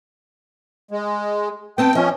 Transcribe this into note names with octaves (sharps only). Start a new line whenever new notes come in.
G#3
B3 C4 G5 A5
F3 C#4 D#5